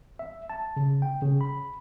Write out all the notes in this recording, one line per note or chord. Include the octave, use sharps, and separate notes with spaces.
E5
A5
C#3
G5
C#3
B5